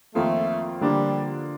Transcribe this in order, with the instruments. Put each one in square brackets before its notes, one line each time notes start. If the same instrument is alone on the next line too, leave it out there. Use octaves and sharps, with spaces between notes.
[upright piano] F2 D#3 A#3 F4 [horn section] A3
[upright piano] D3 F3 A#3 D4 F4 [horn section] G3